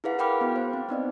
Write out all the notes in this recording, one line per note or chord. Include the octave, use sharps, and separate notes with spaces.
E4 G#4 B4 F5 F#5
A#4 F5 G5 B5 D6 F6
B3 F#4
C5
C4
B3 D#4 D5 D#5